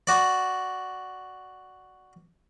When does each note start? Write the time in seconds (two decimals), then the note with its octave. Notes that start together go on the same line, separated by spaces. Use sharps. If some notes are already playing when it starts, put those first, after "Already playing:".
0.07 F#4 D5